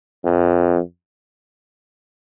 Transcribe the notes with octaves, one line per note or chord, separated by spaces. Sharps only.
F2